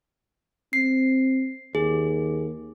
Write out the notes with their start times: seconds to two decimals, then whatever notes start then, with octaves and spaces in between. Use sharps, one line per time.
0.73 C4 C7
1.75 D#2 G#4